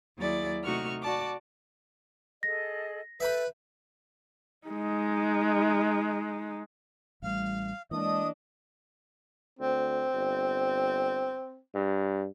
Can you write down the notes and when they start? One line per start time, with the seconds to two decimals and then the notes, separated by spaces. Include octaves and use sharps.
0.17 D#2 F#3 E4 G#4 D5 A6
0.64 C3 A3 D#4 F#4 C#6 F6
1.02 F#4 D5 A5 D6
2.43 G#4 A4 D#5 A#6
3.20 A4 B4 E5 G5 B5
4.67 G#3 D#4
7.22 A1 A2 G3 F5
7.91 E3 G#3 A#3 D4 D#5 D#6
9.59 D2 C4
10.13 G1
11.74 G2